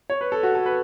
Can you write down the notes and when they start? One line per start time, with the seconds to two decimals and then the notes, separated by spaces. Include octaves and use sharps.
0.10 C#5
0.21 B4
0.32 A4
0.43 F#4
0.55 A4
0.66 B4